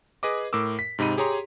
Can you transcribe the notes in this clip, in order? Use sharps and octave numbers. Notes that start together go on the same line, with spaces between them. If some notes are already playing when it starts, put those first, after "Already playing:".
G#4 B4 D#5 D6
A2 A#4 D6 E6
B6
G#2 C3 D#4 B5 D#7
G4 G#4 C#5 A#5 C6